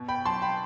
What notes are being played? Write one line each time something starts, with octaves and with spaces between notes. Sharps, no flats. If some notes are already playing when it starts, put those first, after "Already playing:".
Already playing: B2
G5 B5
F#3 A5 C6
G5 B5